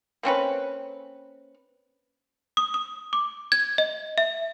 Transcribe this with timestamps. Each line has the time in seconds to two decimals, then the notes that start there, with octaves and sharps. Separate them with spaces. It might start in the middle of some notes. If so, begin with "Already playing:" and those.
0.23 A#3 C4 C#4 B4
2.57 D#6
2.74 D#6
3.13 D6
3.52 G#6
3.78 D#5
4.18 E5